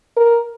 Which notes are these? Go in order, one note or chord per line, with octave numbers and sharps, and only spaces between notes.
A#4